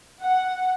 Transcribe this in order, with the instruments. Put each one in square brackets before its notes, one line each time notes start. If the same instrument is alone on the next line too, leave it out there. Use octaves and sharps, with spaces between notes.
[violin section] F#5